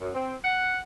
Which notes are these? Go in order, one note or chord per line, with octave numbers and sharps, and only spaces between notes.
F#2
C4
F#5